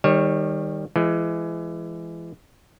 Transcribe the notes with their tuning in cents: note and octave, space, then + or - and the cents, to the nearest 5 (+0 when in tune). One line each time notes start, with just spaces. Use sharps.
D#3 +0 G3 +20 C#5 -15
E3 +30 G#3 +10